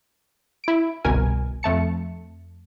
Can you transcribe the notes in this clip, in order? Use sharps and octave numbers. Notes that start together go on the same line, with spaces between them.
E4 D7
G1 C2 B2 A#4 G#5
F2 A3 A5 C#7